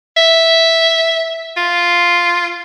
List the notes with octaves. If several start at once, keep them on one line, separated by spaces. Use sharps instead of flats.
E5
F4